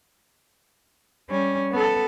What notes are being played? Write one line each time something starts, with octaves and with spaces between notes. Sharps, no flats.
G3 C#4
B3 A4